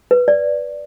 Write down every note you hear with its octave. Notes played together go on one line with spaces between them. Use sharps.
B4
D5